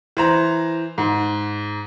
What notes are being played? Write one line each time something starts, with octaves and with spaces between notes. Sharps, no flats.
E3 C5 A#5
G#2